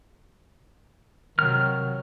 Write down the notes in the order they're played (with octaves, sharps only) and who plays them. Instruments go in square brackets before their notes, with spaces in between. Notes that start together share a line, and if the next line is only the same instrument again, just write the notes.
[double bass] C3 F#3 [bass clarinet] D#3 [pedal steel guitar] F6